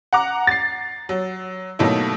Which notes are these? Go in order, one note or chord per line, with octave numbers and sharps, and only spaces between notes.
F#5 A#5 D6
A6 C7
F#3
B2 F#3 A3 A#3 D#4 E4